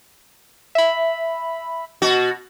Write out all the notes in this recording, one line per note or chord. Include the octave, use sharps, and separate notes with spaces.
E5 B5
B2 F#4